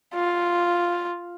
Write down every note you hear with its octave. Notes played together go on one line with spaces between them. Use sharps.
F4